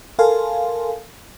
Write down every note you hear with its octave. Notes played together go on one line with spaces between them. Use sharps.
A4 A#4 F5 G#5 A5 C6